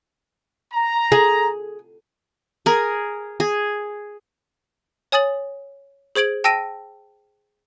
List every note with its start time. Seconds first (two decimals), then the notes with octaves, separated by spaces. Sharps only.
0.73 A#5
1.12 G#4
2.66 G#4 A#4
3.40 G#4
5.12 C#5 G#5 D#6 A6 F#7
6.16 G#4 C5 G#6 D7 F#7
6.44 G5 A5 E6 A#6 D7 D#7